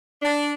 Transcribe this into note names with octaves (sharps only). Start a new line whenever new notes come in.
D4